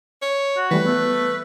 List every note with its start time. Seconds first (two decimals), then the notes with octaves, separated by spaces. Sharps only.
0.22 C#5
0.57 F#4
0.71 E3 G3 A3 B4
0.86 A3 B3